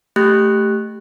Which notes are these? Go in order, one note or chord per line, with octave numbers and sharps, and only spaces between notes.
A3 G4 F#6